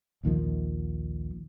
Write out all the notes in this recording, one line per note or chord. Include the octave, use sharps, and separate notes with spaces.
A#1 D#2 D#3 F3